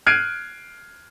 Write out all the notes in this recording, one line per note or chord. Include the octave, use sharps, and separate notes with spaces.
F6 F#6 G#6 C7 D7 D#7